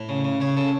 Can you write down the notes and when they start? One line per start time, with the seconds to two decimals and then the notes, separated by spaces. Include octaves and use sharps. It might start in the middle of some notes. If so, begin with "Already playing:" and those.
Already playing: A2
0.09 C#3
0.25 C#3
0.40 C#3 C#5
0.57 C#3 A4